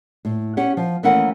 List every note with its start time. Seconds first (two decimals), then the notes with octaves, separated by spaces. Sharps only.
0.25 A2
0.57 C#4 G4 F#5
0.77 F3
1.03 D#2 E3 A3 C#4 A#4 F#5